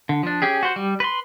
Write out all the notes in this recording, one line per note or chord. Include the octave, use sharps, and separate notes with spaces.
D3
F3 D4
C#4 G4 G#4
F#4 C5
G3
B4 C6